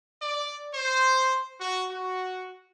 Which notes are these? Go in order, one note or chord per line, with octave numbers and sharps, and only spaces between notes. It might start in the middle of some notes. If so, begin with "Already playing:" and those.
D5
C5
F#4
F#4